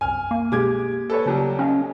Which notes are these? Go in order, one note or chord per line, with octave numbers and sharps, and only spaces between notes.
C2 F#2 G#5 F6
A#3
B2 G#3 G4 D6 G#6
A4 B4 C#5
D#2 C#3 F#3 G3
C#4 D#5 F5